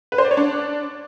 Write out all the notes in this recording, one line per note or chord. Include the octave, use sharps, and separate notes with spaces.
B4
C5
D5
C#5
D4